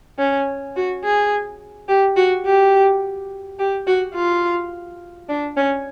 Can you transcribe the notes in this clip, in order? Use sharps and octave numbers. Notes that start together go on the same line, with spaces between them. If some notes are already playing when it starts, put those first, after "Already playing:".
C#4
F#4
G#4
G4
F#4
G4
G4
F#4
F4
D4
C#4